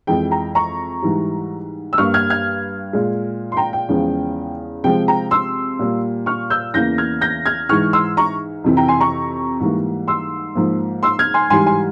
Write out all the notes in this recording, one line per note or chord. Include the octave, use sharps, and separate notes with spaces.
F2 E3 G#3 G5
G5 A#5
A#5 C#6
G#2 E3 G3
E6
G2 G3 A#3 C#6 F6
F6 G#6
F6 G#6
A#2 G#3
C6
G5 A#5
G5
E2 C#3 F3 G#3
C3 F3 G#3 G5
G5 A#5
C6 E6
A#2 G3 A#3
C#6 F6
E6 G6
E2 C#3 E3 A#3 G6 A#6
F6 G#6
G6 A#6
F6 G#6
G#2 E3 G#3 C#6 F6
C6 E6
A#5 C#6
F2 C3 E3
G5 A#5
G#5 C6
A#5 C#6
G#2 E3 G3 A#3
C6 E6
G#2 F3 A#3
C6 E6
F6 G#6
G#5 C6
G#2 E3 G3 G#5 C6
G#5 C6